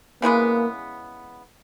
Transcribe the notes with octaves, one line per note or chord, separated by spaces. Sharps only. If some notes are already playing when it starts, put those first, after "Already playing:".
C#3 E3 G#3 A#3 B3